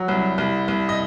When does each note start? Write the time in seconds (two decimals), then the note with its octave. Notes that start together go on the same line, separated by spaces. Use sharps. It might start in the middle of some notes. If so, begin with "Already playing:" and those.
Already playing: F#3
0.08 C2
0.38 C2
0.68 C2
0.89 D#5